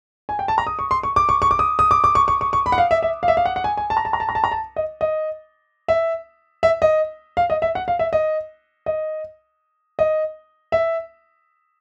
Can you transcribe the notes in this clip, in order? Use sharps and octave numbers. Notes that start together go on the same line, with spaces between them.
G#5
G5
A5
A#5
D#6
C#6
C6
C#6
D6
C#6
C#6
D6
D#6
D#6
D6
D6
C#6
C#6
C#6
C#6
B5
F#5
F5
E5
E5
F5
E5
F5
F#5
F#5
G#5
G#5
A5
A#5
A5
A#5
A5
A#5
A5
A#5
A5
D#5
D#5
E5
E5
D#5
F5
D#5
E5
F#5
F5
E5
D#5
D#5
D#5
E5